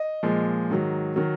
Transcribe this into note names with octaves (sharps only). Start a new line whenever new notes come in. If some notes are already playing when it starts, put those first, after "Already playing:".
Already playing: D#5
A#2 F3 G#3
G#2 D#3 F#3
D#3 F#3